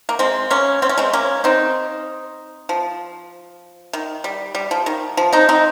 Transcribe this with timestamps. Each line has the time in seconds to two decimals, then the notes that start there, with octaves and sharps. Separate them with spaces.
0.09 A#3
0.19 G#3 C4
0.50 A#3 C#4
0.82 C4
0.89 C#4
0.98 G#3 C4
1.13 A#3 C#4
1.44 C4 D#4
2.69 F3
3.93 D#3
4.24 G3
4.55 G3
4.71 F3
4.86 D#3
5.17 F3
5.33 C4 D#4
5.49 C4 D#4